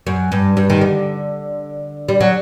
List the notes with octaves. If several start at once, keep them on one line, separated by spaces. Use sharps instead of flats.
F#2
G2
G2
D#3
D3
G3
F#3